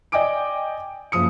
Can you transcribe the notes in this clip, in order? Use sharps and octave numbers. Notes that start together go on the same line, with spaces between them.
D5 D#5 G5 G#5 D6 D7
F#1 F3 D#6 C#7